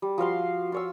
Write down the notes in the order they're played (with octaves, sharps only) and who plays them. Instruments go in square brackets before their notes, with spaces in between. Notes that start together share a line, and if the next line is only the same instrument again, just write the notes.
[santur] G3
F3 F#4 F5 C6
F4 C#5 E6